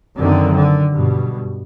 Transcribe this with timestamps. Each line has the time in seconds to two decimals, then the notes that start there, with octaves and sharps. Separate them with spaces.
0.17 F#2 D3 D#3 C4
0.55 D3
0.92 G2 B2